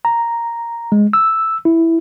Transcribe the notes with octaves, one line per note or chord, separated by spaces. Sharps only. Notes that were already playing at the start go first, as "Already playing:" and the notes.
A#5
G#3
E6
E4